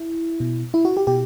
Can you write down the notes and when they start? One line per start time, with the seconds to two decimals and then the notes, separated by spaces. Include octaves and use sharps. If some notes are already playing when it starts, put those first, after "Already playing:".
Already playing: E4
0.40 B2
0.74 E4
0.85 F#4
0.97 G4
1.07 B2 G4